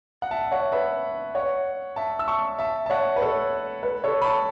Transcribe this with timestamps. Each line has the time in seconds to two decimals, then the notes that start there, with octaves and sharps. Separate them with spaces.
0.22 F#5
0.31 E5 A5
0.46 E5
0.52 C#5 F#5
0.72 B4 E5
1.35 C#5 F#5
1.96 E5 A5
2.19 E6
2.28 A5 C#6
2.59 E5 A5
2.86 A5
2.90 C#5 F#5
3.16 B4
3.22 A4 C#5
3.83 B4
4.04 A4 C#5
4.21 B5
4.24 A5 C#6